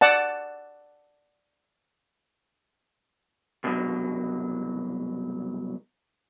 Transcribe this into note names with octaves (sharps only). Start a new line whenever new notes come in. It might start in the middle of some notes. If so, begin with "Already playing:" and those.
D5 F#5 A5
C2 G2 B2 F#3